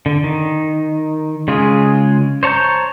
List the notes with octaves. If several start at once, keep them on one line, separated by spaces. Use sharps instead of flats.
D3
D#3
C#3 G#3 F4 G#4
C5 C#5 A5 A#5 G6